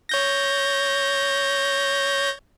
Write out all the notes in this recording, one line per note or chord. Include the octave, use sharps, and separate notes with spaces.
C#5 G6 A#6